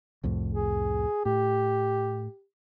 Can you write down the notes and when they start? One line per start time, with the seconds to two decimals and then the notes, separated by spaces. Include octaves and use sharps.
0.23 C2 F2 A2
0.53 G#4
1.25 A2 G4